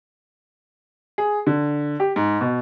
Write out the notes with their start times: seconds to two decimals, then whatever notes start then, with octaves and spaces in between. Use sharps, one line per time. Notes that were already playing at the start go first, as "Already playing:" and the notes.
1.18 G#4
1.47 D3
2.00 G4
2.16 G#2
2.41 B2